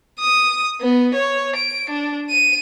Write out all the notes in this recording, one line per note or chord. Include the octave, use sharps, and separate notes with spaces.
D#6
B3
C#5
D7
D4
D#7